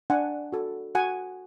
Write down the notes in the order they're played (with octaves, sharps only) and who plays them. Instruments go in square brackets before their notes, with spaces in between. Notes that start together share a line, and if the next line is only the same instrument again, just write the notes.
[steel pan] D4 F#5 G#5
F#4 A4
F#4 F#5 G#5